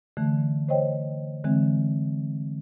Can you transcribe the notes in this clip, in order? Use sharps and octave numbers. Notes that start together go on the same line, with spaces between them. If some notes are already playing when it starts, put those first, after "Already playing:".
D3 E3 A3
C5 C#5 D#5 G5
D3 E3 G#3 C4